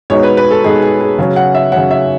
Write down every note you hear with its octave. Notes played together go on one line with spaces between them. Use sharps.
B2 G#3 B3 D#4 C#5
B4
B4
A4
B2 G#3 B3 D#4 G#4
G#4
G#4
C#3 F#3 C#4
F#5
E5
C#3 F#3 C#4 F#5
E5